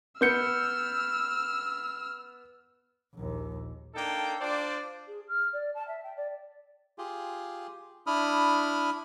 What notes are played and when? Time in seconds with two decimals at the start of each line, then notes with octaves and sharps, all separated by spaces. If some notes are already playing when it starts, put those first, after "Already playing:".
0.21 B3 E6 F6 G6 C#7
3.15 A#1 D#2
3.95 A#3 D4 D#4 A4 G5
4.41 D4 F4 C5 D5
5.07 G#4
5.28 F6
5.53 D5
5.74 A5
5.87 E5
6.03 G5
6.16 D5
6.98 F4 G4 G#4
8.07 D4 E4 B5 D#6 F6